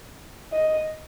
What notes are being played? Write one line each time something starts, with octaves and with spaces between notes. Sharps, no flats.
D#5